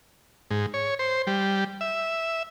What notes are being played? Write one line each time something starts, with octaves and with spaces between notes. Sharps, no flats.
G#2
C#5
C5
G3
E5